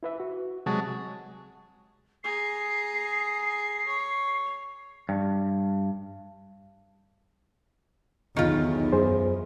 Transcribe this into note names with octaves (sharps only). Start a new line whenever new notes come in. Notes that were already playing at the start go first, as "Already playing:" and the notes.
E4 B4 E5
F#4
C3 F#3 G#3 A5 A6
G#4 A#5 C7
C#5
G2
B1 E2 D#3 F4
F#2 G#4 C5